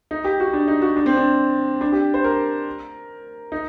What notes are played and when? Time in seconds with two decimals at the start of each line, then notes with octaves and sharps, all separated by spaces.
0.11 D#4
0.24 G4
0.40 F#4
0.53 D4
0.68 D#4
0.82 F#4
0.96 D4
1.06 C4
1.17 D4
1.81 D4
1.92 G4
2.14 C5
2.24 A#4
3.52 D#4